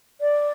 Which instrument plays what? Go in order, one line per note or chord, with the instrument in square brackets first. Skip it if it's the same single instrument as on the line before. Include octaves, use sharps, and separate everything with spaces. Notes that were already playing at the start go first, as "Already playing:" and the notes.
[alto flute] D5